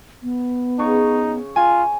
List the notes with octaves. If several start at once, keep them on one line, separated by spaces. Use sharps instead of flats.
B3
C#3 D#4 C#6
F4 G#5